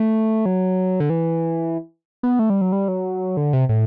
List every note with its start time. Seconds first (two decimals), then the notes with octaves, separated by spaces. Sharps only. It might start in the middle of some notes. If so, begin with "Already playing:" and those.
Already playing: A3
0.46 F#3
1.00 D3
1.10 E3
2.23 B3
2.39 A3
2.50 G3
2.61 F#3
2.72 G3
2.88 F#3
3.37 D3
3.53 C3
3.69 A2